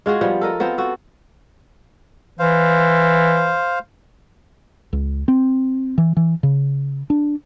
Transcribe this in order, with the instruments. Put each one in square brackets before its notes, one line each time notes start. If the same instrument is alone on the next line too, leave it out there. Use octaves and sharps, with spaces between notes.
[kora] G#3 F4 F#4 G#4
F3 G3 B3
A4 A#4 D#5
B3 C4 F4 C5
F#4 A4
[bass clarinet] E3 [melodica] C5 F5
[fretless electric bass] C#2
C4
E3
E3
C#3
D4